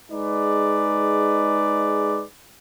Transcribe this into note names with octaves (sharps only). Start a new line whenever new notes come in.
G#3 D#4 G#4 B4 D5